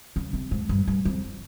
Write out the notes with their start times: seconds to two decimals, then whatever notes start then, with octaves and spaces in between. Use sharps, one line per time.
0.16 C#3
0.33 C3
0.51 G#2
0.69 G2
0.87 G2
1.05 F2